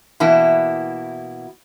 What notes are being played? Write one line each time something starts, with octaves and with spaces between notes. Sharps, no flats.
B2 E3 A#3 E4